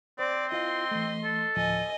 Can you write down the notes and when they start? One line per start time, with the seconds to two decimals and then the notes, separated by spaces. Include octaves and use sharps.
0.19 C4 C5 D5
0.52 E4 F4 D#5 F5 C6
0.91 E3 A3
1.25 A4
1.57 D2 A2 F3 D#5 G#5